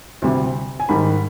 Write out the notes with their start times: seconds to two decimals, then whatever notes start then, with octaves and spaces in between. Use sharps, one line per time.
0.22 D2 C3 G3
0.80 G#5
0.89 G#2 D#3 G3 B5